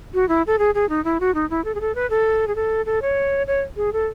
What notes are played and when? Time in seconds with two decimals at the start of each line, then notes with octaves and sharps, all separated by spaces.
0.14 F#4
0.29 E4
0.47 A4
0.59 G#4
0.75 G#4
0.89 D#4
1.04 E4
1.20 F#4
1.34 D#4
1.50 E4
1.65 A4
1.75 G#4
1.81 A4
1.95 B4
2.10 A4
2.47 G#4
2.55 A4
2.86 A4
3.02 C#5
3.47 C#5
3.77 G#4
3.93 A4